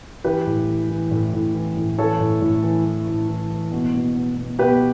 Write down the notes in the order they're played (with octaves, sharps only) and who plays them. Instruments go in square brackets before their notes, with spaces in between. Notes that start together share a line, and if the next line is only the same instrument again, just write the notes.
[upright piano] E3 G4 B4
A2
E3
E3
A2
A2
E3
A2
E3 A4 C#5
A2
A2
E3
E3
A2
E3
E3
B2
B2
B2
B2
B2 G4 B4